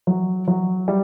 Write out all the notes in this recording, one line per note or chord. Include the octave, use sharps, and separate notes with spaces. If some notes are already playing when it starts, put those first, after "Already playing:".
F#3
F#3
G3